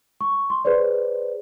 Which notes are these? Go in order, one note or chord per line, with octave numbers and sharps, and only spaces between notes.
C#6
C6
G#4 B4 C5 D5